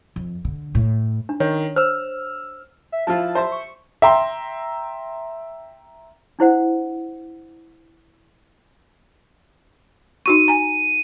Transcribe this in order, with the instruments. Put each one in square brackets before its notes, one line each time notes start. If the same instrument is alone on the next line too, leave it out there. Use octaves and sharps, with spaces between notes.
[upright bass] F2
D3
A2
[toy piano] D4
[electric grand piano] D#3 [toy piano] C#5
[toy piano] C5 [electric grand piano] E6 F6
[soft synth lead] E5
[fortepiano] F3 E4 F4 [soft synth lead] A5
[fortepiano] C5 E5 C6
[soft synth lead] C#6
[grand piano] E5 G5 A#5 C6
[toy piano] D4 E4 C5 F#5
[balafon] D#4 F#4 C#6 [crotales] D#7
[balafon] G#5 A#5